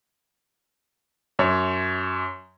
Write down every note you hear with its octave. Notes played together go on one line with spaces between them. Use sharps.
F#2 C#5